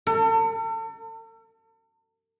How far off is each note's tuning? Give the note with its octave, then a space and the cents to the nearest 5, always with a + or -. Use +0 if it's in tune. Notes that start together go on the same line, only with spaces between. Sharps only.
A4 +40